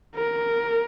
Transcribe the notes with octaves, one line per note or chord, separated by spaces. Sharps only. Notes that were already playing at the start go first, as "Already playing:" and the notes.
A#4